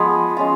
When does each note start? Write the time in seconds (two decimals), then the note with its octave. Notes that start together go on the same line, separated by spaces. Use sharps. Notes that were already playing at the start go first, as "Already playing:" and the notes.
Already playing: F3 G#3 B3 G#4
0.37 G#3 C#4 F4